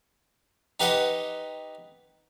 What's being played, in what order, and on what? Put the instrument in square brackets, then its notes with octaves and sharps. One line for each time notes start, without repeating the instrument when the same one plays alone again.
[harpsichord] D#4 G4 B4 D#5 F#5 C6